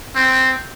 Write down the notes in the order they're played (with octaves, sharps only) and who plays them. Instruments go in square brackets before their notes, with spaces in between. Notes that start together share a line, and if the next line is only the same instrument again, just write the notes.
[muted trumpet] C4